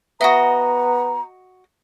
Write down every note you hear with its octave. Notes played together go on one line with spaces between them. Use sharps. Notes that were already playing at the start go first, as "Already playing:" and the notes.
B3 F#4 D#5 E5 F#5 A#5 D#6